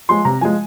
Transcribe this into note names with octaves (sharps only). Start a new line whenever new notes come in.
F3 G#3 C6
C3 A#5
F3 G#3 G#5